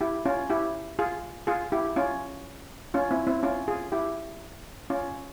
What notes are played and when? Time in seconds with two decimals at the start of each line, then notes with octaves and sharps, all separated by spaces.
0.01 E4 G4
0.25 C#4 F4
0.50 E4 G4
0.99 F4 G#4
1.47 F4 G#4
1.72 E4 G4
1.96 C#4 F4
2.94 C#4 F4
3.11 C4 E4
3.27 C4 E4
3.43 C#4 F4
3.68 F4 G#4
3.92 E4 G4
4.90 C#4 F4